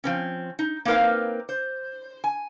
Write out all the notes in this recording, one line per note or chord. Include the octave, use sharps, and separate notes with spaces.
F3 C4 C#4
D#4
A#3 C4 D#4 A#4 B4 F5
C5
G#5